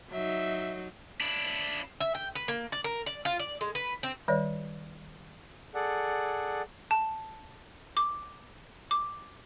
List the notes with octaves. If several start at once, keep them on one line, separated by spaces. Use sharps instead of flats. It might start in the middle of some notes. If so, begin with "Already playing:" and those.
F#3 D#4 E5
D4 E4
E5
G5
B4
A#3
D5
A#4
D5
F4
D5
G#3
B4
C4
D#3 G3 C#5 D5
G#4 A4 D5 F#5
A5
D6
D6